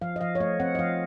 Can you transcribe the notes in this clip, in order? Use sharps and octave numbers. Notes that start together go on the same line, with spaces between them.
F3 F5
D#5
F3 F5
C#5
A3 D#5
C4 F#5
D#5
F3 F5